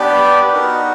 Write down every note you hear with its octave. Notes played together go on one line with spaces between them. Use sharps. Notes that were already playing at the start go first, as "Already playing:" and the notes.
Already playing: B3 D4 G4 B4 D5
B3 D#4 F#4 A#4